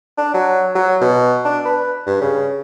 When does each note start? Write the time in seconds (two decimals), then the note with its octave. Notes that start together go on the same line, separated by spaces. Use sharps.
0.18 D4
0.34 F#3
0.75 F#3
1.01 B2
1.45 D4
1.65 B4
2.07 G2
2.21 C#3